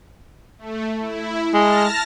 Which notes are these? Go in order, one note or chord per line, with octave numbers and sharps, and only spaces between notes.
A3
E4
G#3 A5 F6 A#6